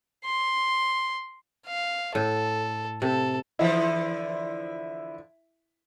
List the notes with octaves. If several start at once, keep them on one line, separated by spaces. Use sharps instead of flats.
C6
F5
A2 A4
C3 A4
D3 E3 F3 E4 E5